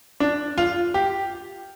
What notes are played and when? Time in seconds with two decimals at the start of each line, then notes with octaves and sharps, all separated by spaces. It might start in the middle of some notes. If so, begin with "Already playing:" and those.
0.20 D4
0.58 F4
0.94 G4